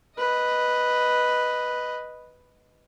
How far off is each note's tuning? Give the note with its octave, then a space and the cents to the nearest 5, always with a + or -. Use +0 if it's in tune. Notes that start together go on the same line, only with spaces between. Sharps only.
B4 +0 D#5 +0